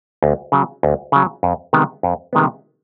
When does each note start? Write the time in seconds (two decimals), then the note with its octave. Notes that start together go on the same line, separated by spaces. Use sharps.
0.23 D2
0.52 C#3 F#3
0.83 D2
1.12 C#3 F#3
1.43 F2
1.73 C3 D#3 G#3 B3
2.03 F2
2.33 C3 D#3 G#3 B3